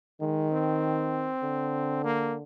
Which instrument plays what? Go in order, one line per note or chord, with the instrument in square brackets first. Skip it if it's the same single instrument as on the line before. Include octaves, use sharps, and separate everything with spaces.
[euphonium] D#3 [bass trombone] G#3
[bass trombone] C4
[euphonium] D3
[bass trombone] A#3